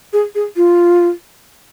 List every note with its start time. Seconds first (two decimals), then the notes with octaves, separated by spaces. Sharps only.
0.13 G#4
0.35 G#4
0.56 F4